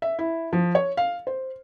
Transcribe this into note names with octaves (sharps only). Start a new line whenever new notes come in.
E5
E4
F3
C#5
F5
C5